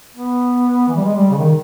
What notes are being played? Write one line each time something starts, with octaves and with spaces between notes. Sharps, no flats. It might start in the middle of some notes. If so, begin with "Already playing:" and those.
B3
E3
G3
G#3
G3
C#3
D#3